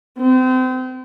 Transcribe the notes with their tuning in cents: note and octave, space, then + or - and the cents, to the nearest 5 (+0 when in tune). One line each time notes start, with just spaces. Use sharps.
C4 -35